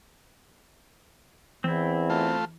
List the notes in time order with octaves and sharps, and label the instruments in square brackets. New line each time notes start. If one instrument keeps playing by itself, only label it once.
[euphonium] E2 [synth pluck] E3 [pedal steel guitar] C4 E4
[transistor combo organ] A3 F4